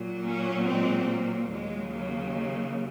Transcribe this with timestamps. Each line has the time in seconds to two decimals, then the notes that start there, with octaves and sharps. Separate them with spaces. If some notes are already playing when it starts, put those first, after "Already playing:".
Already playing: A#2 F#3
0.24 A#3 C#4
0.66 G#3 C4
1.08 A#3
1.50 D#2 C#3 F#3 G#3
1.92 A#3
2.33 A#3